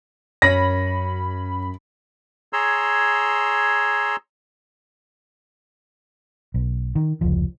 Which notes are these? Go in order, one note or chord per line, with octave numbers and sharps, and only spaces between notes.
F#2 C#4 B5 A#6
G#4 C#5 A#5 C6 E6
B1
D#3
F1 C#2 F3